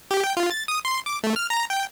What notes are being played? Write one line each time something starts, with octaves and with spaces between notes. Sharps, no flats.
G4
G5
F4
A6
D#6
C6
D6
A3
F6
A#5
G5